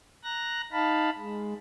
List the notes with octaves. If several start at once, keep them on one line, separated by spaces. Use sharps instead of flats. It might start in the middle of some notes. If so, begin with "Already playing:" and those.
A#5 F#6 A#6
D#4 F5 A5 B5
G#3